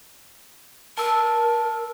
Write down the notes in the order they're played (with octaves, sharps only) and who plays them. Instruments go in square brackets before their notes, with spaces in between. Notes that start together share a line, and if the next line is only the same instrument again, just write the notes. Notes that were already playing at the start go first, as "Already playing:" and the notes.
[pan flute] A#4 [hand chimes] A5 E6